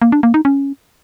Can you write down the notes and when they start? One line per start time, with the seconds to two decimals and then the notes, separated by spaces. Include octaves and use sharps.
0.02 A#3
0.12 D4
0.23 A#3
0.34 D#4
0.45 C#4